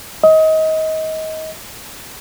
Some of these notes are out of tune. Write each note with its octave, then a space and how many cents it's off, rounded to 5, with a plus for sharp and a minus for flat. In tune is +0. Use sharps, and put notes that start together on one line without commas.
D#5 +25